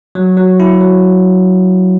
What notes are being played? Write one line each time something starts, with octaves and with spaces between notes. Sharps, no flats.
F#3
F#3
E4
F#3